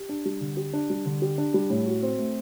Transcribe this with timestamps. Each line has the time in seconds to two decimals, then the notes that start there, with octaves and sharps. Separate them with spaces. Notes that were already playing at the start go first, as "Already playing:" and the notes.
Already playing: G4
0.09 D4
0.25 G3
0.41 D3
0.57 G4
0.73 D4
0.90 G3
1.06 D3
1.22 G4
1.38 D4
1.54 G3
1.70 A2
1.86 F#4
2.02 C4
2.18 A3